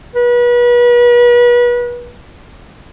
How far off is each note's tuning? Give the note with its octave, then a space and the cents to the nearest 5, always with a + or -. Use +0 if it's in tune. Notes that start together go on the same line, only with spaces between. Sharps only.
B4 -35